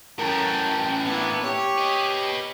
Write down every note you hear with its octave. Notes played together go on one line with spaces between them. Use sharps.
A2 E3 C#4 A#4 G5 A5
A#3 B3 D4 E4
G4 C#5
B4 D#5